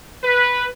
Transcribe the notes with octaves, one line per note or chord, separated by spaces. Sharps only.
B4